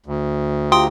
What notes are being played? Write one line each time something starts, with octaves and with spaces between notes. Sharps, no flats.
D2
F4 G4 G5 A#5 C6 D#6